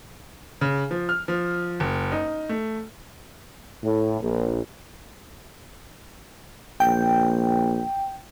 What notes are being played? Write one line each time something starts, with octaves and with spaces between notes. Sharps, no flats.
C#3
F3
F6
F3
F#1
D#4
A3
A2
A#1
A#1 G5